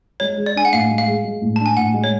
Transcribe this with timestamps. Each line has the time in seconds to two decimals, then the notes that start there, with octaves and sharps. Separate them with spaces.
0.20 G#3 C#5
0.38 G#4
0.46 D5
0.55 D4 G#5
0.65 F#5
0.73 A2 F5
0.90 G#3
0.98 F5
1.08 G#4
1.24 G#3
1.41 A2
1.56 D4 A5
1.66 G#5
1.77 A2 F#5
1.94 G#3
2.04 C#5